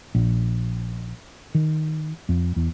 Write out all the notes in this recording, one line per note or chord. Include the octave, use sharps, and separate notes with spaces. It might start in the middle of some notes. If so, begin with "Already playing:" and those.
A#1
D#3
F2
E2